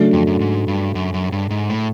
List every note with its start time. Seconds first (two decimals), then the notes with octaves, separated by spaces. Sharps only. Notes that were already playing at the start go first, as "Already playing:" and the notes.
Already playing: C#3 F#3 A3 D4
0.13 F2
0.27 F#2
0.40 G#2
0.68 G2
0.95 F#2
1.14 F#2
1.32 G2
1.50 G#2
1.69 A2